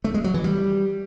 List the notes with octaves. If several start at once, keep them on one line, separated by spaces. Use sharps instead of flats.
A3
G#3
F#3
E3
G3